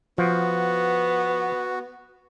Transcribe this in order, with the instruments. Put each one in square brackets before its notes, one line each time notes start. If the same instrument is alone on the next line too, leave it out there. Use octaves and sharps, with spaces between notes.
[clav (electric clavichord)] F3 [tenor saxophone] B3 [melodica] F#4